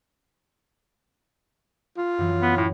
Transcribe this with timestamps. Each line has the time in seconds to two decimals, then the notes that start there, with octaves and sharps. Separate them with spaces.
1.97 F4
2.18 F#2 E3
2.42 B3
2.57 A2